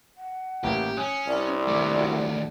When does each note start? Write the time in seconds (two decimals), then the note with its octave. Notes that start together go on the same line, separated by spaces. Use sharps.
0.18 F#5
0.64 A1 A#3 G4
0.97 C#4 G#5 D#6 F#6
1.27 C2 D5
1.68 D#2 A3 D6
2.00 F#4